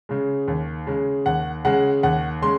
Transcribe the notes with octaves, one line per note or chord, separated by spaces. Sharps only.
C#3 G#3
D#2
C#3 G#3
D#2 F#5
C#3 G#3 F#5
D#2 F#5
C#3 G#3 C6